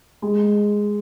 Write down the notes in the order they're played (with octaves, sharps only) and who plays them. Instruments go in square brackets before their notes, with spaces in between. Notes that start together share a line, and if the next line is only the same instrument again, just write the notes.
[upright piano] G#3